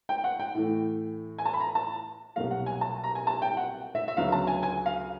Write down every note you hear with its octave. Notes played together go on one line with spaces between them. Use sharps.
G5
F#5
G5
A2 E3 A3
G#5
A5
B5
A#5
A5
C2 B2 F#3 A#3 F5
F#5
G#5
A5
A#5
G#5
A5
G5
F#5
E5
E5
D2 C#3 F#3 B3 F5
A5
G#5
G#5
F5